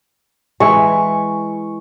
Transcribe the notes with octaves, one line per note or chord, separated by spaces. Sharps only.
E3 G#3 E4 C#6